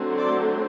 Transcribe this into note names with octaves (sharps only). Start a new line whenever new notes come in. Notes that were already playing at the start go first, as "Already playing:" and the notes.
Already playing: D3 F#3 A3 C4
C5 D5